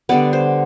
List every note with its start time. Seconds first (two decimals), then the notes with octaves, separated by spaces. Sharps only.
0.09 D3 G3 B3 D5
0.33 C5